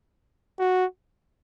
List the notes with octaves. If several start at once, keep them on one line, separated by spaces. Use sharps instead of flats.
F#4